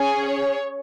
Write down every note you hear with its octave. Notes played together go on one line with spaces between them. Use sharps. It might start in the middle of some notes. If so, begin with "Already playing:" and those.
Already playing: C#4 G#4 G#5
C#5